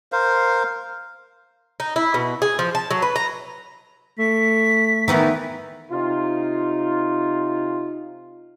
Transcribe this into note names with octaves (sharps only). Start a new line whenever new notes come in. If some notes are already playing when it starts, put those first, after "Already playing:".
A#4 C5 F5
D#4
E4
B2
G#4
F3
A5
F#3
B4
A#5
A3 B6
D#3 E3 B3
C3 D#4 F4